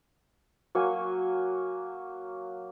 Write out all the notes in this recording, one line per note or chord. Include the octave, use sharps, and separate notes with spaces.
F#3 A#3 C#5 G#5